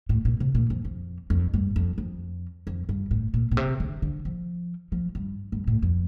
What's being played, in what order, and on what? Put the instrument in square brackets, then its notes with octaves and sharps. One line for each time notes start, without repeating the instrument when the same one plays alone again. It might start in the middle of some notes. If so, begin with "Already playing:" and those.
[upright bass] A2
A#2
C3
A#2
F2
F2
F2
G2
F2
F2
F2
G2
A2
A#2
A#2
C3
D3
D3
F3
F3
G2
G2
A2
F2